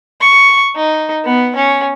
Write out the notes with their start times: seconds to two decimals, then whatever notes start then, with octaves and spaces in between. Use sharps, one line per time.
0.21 C#6
0.76 D#4
1.25 B3
1.56 C#4